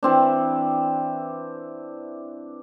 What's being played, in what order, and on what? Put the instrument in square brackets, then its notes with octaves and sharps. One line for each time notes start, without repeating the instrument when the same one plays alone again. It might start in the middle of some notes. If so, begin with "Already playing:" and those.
[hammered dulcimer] E3 C4 D4